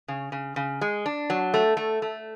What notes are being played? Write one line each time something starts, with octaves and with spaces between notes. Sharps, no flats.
C#3
C#3
C#3
G#3
D4
F#3
A3
A3
A3